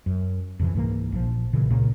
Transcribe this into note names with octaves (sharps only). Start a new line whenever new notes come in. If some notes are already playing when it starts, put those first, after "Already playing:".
F#2
F2 C3 E3
C#2 G#2 E3 A#3
A#1 F3
B1 A#2 C#3 E3
C#2 A#2 C#3 A#3